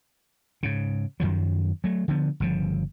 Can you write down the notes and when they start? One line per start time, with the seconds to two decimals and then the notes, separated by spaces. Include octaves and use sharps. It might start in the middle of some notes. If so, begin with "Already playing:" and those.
0.63 G#2 C#3
1.20 F#2 D#3 F3 F#3
1.84 F#3 A3
2.08 D3 F3 B3
2.40 G1 C#3 F3